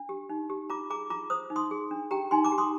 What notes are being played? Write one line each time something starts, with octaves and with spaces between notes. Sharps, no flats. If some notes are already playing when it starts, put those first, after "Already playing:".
Already playing: D4
G4
D#4
G4
F4 A#5 D6
G#4 A#5 D6
F4 A#5 D6
C5 D#6
D#4
C6 D#6
G#4
D4
G4 G5 A#5
D#4 G#5 C6
A#5 D6
G4
C6 D#6